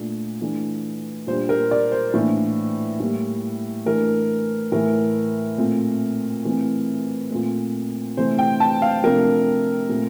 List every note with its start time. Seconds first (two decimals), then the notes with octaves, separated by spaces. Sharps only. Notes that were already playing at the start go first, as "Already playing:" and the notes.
Already playing: A#2 A3 D4
0.41 E3 A3 D4
1.27 A#2 G3 D4 C5
1.49 A#4
1.71 D5
1.92 C5
2.14 A2 E3 A#3 D4
3.00 A2 G3 A#3
3.86 E3 A3 D4 A#4
4.72 A2 E3 A3 A#4
5.58 A#2 A3 C4
6.45 E3 A3 C4
7.31 A#2 A3 C4
8.17 C3 E3 A3 C5
8.39 G5
8.60 A5
8.82 F5
9.04 C3 F3 A3 D4 A#4
9.89 A#2 A3 C4